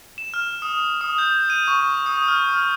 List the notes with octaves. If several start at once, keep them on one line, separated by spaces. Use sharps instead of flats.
E7
F6
D#6
D#6
G6
D#7
C#6
D#6
F6
F6